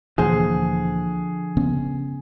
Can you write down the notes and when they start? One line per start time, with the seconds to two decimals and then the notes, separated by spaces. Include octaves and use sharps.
0.18 D2 A#2 D3 E3 F3 G#4 C5
1.57 C#3 B3 C#4